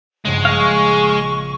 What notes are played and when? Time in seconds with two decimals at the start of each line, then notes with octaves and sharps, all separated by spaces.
0.25 A#1 G2 C#3 G#3
0.45 G#4 D#5 F5 G#5 C#6 F6